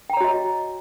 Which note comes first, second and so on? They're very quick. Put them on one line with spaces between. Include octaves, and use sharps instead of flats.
G5 A#5 C#5 F#4 D#5